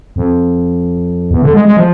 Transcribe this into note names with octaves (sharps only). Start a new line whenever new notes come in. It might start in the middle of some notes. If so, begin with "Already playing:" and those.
F2
E2
D3
G#3
G#3
F3